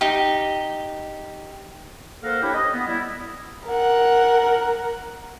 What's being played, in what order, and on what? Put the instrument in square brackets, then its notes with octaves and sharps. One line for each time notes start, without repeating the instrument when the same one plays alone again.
[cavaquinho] D#4 G4
[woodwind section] A#3 A4 A#4 C5 F5 F#5
D4 E4 G4 C#5 G5 B5
D#5
B3
G3 E4
[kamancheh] A#4 F#5